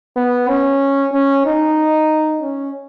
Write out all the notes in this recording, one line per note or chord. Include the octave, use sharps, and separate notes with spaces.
B3
C#4
C#4
D#4
C#4